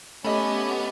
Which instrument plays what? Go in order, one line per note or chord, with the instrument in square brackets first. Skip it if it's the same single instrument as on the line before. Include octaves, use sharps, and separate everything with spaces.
[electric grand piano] A3 D#5 [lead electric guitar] B3 [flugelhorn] C#4 [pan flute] G4